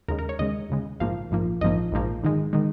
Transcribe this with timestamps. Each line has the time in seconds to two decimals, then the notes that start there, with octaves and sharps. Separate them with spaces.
0.08 D#2 C#3 G#3 A#4
0.19 A#4
0.29 C#5
0.39 D#2 C#3 G#3 D#5
0.69 D#2 C#3 G#3
1.00 A#1 G#2 F3 A#3 F5
1.31 A#1 G#2 F3 A#3
1.61 A#1 G#2 F3 A#3 D#5
1.92 A#1 G#2 F3 A#3
2.23 G#2 D#3 G#3
2.53 D#3 G#3